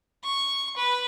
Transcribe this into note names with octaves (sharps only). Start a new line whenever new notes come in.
C#6
B4